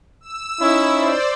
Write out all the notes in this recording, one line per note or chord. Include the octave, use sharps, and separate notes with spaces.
E6
C#4 D#4 E4
C5 D5